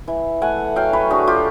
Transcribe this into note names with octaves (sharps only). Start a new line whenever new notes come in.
E3
A3 F#5 G#5
F#3 F5 G5
B4 C#5
D3 F#4 G#4
F4 G4